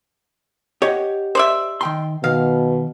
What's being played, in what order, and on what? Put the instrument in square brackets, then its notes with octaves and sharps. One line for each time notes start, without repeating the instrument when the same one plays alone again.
[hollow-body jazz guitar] G4 D#5 F#5 [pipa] C#5
[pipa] C5 D5 E5
[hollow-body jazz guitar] D#3 G5 C6
[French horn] B2 [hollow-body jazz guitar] D#3 [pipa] F5